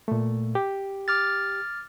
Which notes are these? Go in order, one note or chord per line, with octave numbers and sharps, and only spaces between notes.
A#2 A3
G4
D6 F6 A6